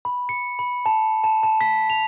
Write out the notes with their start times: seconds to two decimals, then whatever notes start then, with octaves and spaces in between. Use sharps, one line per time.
0.05 B5
0.29 C#7
0.59 B5
0.86 A5
1.24 A5
1.43 A5
1.61 B6
1.90 F7